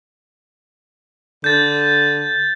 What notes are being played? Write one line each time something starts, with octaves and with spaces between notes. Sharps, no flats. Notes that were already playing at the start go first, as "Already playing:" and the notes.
D3 G6 A6